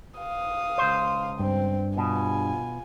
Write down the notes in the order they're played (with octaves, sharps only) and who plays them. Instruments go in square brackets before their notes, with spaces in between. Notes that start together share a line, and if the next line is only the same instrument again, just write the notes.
[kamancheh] F5 D#6
[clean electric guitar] C#2 C5
[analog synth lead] G2 [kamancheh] C4
[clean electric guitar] B2 [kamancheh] F4 G#5